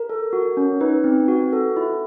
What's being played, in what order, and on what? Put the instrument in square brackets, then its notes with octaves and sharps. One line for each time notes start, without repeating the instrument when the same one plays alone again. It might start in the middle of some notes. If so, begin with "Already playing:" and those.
Already playing: [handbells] A#4
A4
F#4
C#4
D#4 B4
C4
F#4
A4
E4